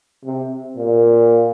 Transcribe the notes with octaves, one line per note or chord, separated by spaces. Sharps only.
C3
A#2